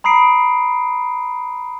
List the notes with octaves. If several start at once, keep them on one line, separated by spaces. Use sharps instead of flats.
A#5 B5 D#6 C7 D7